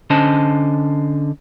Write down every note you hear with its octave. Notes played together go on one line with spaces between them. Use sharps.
D3 C#4 C5 D#5 A5